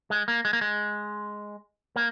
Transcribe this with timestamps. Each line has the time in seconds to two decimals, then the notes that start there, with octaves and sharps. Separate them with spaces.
0.10 G#3
0.28 A#3
0.45 G#3
0.53 A#3
0.61 G#3
1.96 A#3